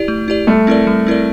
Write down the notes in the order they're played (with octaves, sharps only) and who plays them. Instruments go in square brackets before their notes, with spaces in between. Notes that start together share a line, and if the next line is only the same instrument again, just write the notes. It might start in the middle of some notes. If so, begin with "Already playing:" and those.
Already playing: [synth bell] E4 G4 D5
A3
E4 G4 D5
[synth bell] G3 [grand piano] A3
[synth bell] C4 E4 A#4 D5
G3
C4 E4 A#4 D5